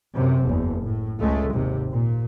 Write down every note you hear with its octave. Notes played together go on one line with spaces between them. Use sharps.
F#2 C3
F#1 E2
A2
C#2 G#3 A3
G#1 D#2 C3
A#2